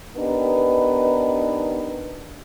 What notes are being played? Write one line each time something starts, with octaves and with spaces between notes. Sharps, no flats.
B3 D4 D#4 G4 A#4 B4